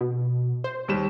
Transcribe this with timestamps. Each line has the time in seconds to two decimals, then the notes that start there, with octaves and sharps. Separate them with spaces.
0.01 B2
0.64 C5
0.88 D#2 G3 E7